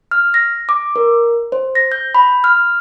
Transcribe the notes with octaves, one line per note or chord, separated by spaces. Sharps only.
F6
A#6
D6
A#4
C5
A#6
G6
B5
F6